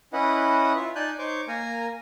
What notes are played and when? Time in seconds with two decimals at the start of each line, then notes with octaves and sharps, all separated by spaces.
0.13 C#4 E4 B4 D#5 F#5
0.76 F4 E5
0.95 D#4 D5 G#5 A5 F#6 G6
1.19 D#4 C5 C#5 C#6 D6 G6
1.48 A#3 A#4 G#5 A#5